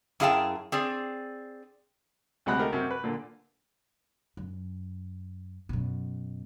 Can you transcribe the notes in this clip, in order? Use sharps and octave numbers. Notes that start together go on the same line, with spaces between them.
F#2 E4 G#4 F5 G5 A5
C4 G#4 D5
D2 C3 G#3 F#5 B5 F#6
A3 D#4 G4 A#4
F#2 C3
B4
A#2 D3
F#2
F#2 B2